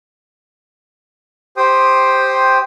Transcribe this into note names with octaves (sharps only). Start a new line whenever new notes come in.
G4 C5 G5 C6 D#6